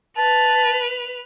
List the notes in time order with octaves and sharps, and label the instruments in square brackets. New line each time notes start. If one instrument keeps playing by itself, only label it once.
[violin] B4 F7 [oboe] A5